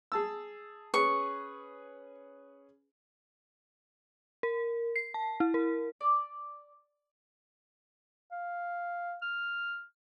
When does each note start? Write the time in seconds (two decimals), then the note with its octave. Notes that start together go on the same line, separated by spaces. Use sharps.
0.12 G#4 A5 E6
0.94 C#4 G#4 B4 C#6
4.43 A#4
4.96 C7
5.14 A5
5.40 E4
5.54 A#4
6.01 D5
8.32 F5
9.22 F6